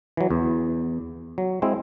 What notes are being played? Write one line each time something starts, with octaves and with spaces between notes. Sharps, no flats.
E3 F#3
E2
F#3
G#3 C4 E4